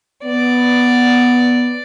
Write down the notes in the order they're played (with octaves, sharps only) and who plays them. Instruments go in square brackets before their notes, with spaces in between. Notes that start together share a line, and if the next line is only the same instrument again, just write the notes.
[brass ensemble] B3 [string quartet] D5